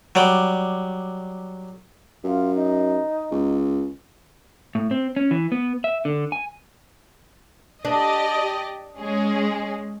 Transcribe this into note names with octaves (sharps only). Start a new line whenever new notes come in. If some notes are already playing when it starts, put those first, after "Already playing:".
F#3 G3 D5
F#2 F4
D#4
C#2
A2
C4
C#4
E3
B3
E5
D3
G#5
D4 G4 D5 D#5
G#3 C#4 G#4